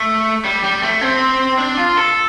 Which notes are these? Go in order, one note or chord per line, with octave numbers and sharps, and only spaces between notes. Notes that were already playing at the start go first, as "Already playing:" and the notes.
Already playing: A3
G3
G3
A3
C4
D4
F4
A4